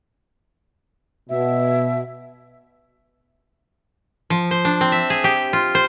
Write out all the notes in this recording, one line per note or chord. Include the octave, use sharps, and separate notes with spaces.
B2 E5
F3
C5
D4
C4
E5
G#4
G4
F4
C5